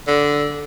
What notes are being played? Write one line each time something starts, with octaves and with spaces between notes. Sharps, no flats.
D3